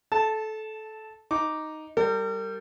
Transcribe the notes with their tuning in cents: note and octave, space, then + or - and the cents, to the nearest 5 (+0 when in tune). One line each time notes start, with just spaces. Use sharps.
A4 -20 A5 +0
D#4 +0 D6 +0
G3 +0 A#4 -40